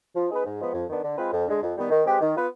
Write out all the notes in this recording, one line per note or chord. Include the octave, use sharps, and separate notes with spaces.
F3
B3 D#4 G#4 B4
G#2
F3 G#3 B3
F2
D#3 B3 D4
D3
G#3 C4 F4 B4
F2
D3 G#3
F2
D#3 G3 B3
D#3
G#3 C4 G4 B4
D#3
B3 F4 B4